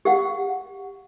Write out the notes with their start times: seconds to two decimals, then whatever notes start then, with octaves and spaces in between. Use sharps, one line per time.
0.05 G4 F5 F#5